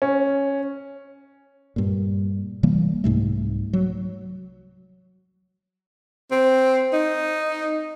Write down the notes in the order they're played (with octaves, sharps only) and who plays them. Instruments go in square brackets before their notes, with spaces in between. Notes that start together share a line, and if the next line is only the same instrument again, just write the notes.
[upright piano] C#4
[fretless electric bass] G2 A#2
C3 E3 G3 A#3
C2 G#2 C3 A3
F#3
[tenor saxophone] C4
D#4